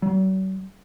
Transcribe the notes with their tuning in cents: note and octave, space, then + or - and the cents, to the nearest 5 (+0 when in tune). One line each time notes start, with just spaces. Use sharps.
F#3 +45